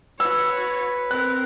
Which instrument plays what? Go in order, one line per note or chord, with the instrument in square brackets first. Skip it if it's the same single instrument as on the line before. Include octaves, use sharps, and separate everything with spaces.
[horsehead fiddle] F#4 C#5 [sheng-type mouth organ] B4 [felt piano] E6
[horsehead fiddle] C4 A#4 [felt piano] F#6